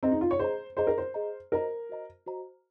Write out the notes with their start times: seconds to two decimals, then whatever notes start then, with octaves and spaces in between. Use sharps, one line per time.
0.03 C4 G#4 D#5 A#5
0.12 D#4
0.21 F4
0.31 C#5
0.39 G#4 C5 D#5 A#5
0.77 G#4 C5 D#5 A#5
0.87 A#4
0.98 C5
1.14 G#4 D#5 A#5
1.52 F#4 A#4 C5 D#5 A#5
1.89 F#4 C5 D#5 A#5
2.27 F#4 C5 D#5 A#5